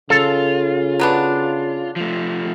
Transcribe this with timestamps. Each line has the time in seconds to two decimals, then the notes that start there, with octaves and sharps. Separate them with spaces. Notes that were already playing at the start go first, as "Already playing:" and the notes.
0.10 C#3 F4 A4
1.00 F#3 B3 D4
1.96 F3 A3